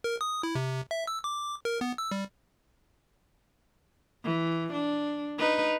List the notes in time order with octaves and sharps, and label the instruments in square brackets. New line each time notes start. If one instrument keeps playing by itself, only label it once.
[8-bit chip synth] A#4
D#6
E4
C3
E5
E6
D6
A#4
B3
E6
G3
[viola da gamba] E3
D4
D#4 B4